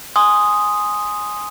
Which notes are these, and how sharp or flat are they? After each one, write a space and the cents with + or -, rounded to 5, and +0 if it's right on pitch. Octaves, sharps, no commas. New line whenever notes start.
G#5 +0 C6 +0 D#6 +0